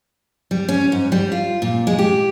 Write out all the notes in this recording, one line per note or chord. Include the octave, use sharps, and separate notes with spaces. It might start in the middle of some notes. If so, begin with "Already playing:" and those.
G3
C#4
G#2
G3
F4
A#2
G#3
G4